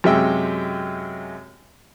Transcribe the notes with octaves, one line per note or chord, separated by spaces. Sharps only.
F#2 C3 G#3 E5 G5 E6